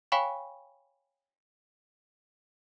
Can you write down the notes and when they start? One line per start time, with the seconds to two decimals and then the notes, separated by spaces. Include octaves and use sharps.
0.12 C#5 F5 G5 G#5 B5 C#6